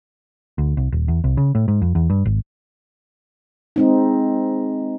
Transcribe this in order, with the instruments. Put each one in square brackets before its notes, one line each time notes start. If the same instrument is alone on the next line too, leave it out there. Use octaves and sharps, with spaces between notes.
[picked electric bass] D2
C2
D#1
E2
C2
C#3
A2
G#2
F2
E2
G2
G#1
[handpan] G#3 C4 D#4